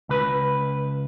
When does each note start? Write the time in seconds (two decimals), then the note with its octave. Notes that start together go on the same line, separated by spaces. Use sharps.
0.09 C#2 B4